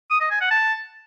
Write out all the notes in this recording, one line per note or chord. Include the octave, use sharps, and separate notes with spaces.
D#6
D#5
G#5
F#5
A5